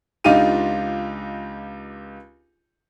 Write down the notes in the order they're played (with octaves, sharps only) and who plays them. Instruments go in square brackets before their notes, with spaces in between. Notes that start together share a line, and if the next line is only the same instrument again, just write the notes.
[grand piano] C#2 D4 D#4 F4 G4 D#7